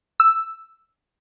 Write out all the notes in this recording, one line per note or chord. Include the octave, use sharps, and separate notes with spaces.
E6